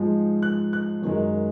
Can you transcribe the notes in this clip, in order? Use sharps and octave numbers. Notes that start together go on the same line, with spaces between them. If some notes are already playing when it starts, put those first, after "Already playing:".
Already playing: G#2 F3 G#3
F#6
F#6
F#2 D#3 G#3